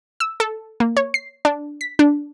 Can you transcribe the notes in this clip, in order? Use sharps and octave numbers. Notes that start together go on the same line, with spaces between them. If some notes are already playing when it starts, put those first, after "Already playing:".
E6
A4
A#3
C#5
C7
D4
B6
D4